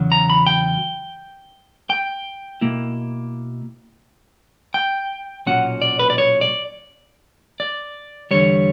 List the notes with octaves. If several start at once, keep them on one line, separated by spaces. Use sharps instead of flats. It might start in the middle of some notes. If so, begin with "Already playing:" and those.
Already playing: E2 C#3 F#3
A#5
B5
G5
G5
B2 A#3 E4
G5
B1 A#2 F#3 C#4 F#5
D5
B4
D5
C#5
D5
D5
E2 D3 G3 C#5